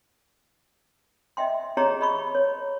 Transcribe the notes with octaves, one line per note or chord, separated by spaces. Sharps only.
D#5 E5 G5 C6
G4 G#4 C#5 D#5 A#5 C6
D#5 B5 C#6
C#5